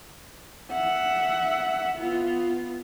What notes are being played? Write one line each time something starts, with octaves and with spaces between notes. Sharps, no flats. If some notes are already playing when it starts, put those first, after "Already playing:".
E5 F#5
B3 F4